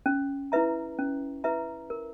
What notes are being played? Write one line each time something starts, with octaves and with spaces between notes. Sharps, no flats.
C#4
E4 B4 E5 A#5
C#4
E4 B4 E5 A#5
A#4